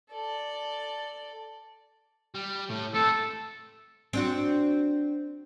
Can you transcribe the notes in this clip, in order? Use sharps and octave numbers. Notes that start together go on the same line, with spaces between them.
A4 D5
G3
A2
A3 C4 A4
C4 D4 F#4